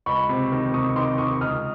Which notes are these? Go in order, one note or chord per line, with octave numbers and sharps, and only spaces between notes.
C#2 B5 C#6
C3
D#3
C3 C#6 D#6
D#3 C6 D6
D#3 C#6 D#6
C#2 D#6 F6